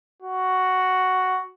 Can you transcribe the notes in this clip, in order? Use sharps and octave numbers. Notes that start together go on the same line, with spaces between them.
F#4